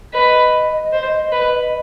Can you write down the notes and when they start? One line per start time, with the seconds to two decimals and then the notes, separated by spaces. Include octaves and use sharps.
0.13 B4 D#5
0.92 C5
1.32 B4